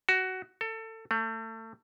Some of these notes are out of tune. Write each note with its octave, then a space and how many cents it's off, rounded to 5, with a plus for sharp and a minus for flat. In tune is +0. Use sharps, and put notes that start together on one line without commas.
F#4 +15
A4 +25
A3 +30